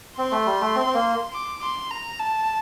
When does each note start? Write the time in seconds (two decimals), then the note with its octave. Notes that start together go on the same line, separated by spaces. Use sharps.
0.18 C4 C6
0.32 A3
0.46 G3
0.61 A3
0.76 C4
0.86 C4
0.94 A#3
1.33 D6
1.62 C6
1.91 A#5
2.19 A5